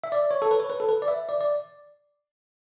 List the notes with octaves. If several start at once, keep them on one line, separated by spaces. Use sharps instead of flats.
E5
D5
C#5
A4
B4
C#5
B4
A4
B4
D5
E5
D5
D5